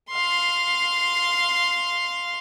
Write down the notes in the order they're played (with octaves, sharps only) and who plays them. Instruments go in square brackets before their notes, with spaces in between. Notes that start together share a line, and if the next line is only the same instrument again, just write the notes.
[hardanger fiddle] F5 C6